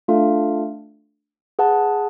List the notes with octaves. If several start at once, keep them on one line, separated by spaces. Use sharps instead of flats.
A3 D4 F4 A4 F5
G#4 B4 F#5 A5